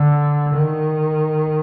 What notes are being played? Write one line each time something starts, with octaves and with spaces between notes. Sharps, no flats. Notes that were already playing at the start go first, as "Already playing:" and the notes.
Already playing: D3
D#3